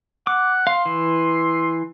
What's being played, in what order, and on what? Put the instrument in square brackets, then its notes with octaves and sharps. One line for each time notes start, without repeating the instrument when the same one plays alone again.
[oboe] F#5 [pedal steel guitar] D6
[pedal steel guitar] F5 [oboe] C6
[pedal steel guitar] E3